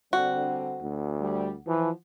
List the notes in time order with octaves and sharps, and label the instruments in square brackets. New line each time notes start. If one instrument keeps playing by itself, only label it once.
[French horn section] D3 G3 C4 [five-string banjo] F#4
[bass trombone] D2
[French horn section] G3
[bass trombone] E3 [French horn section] F3